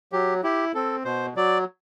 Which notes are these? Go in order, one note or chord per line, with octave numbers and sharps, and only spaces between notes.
F#3 G4
E4 G4
C4 A4
B2 C5
F#3 D5